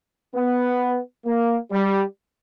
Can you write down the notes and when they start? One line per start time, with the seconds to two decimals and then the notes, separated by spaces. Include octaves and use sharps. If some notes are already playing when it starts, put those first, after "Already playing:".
0.35 B3
1.25 A#3
1.71 G3